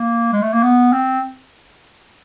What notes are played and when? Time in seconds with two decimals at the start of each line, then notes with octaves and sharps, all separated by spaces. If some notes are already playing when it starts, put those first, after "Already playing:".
Already playing: A#3
0.33 G#3
0.42 A3
0.53 A#3
0.63 B3
0.92 C4